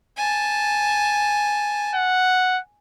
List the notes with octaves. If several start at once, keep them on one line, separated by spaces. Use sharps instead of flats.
G#5 A5
F#5